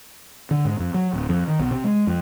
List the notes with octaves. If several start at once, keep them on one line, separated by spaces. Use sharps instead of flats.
D3
G#2
F2
F#3
D1
F2
D#3
B1
C3
G#3
F2